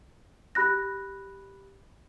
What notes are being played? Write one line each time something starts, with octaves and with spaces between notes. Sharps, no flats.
G4 B5 F#6 A#6